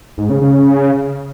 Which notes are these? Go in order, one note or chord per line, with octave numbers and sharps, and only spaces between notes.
G#2
C#3
C#3